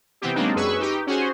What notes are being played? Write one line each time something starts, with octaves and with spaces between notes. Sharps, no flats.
C3 E3 B3 C4 G4
F#3 G#3 A#3 C4 D4 D#4
F#2 G#4 B4 C#6 E6
D#4 G4
C#4 F#4 G#4 C5